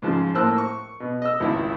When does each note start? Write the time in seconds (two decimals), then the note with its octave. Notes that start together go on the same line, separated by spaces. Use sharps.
0.02 G#2 C#3 F3
0.34 A2 A#3 C5 A5 E6 F#6
0.58 C#6
1.00 B2
1.22 D#5 E6
1.40 G#1 C#2 E4